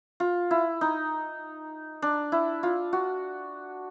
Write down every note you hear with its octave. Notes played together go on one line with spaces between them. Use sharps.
F4
E4
D#4
D4
E4
F4
F#4